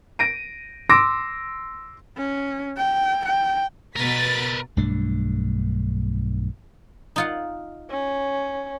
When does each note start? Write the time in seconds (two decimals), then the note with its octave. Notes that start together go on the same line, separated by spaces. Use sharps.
0.19 A#6 D7 D#7
0.89 C6 D6 E6 A#6 D7
2.17 C#4
2.77 G5
3.26 G5
3.96 B2 A#4 B4 A6 B6
4.77 B1 G2 A3 D4
7.16 D#4 F4 F#5
7.90 C#4